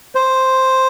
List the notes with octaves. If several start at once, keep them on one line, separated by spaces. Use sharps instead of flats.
C5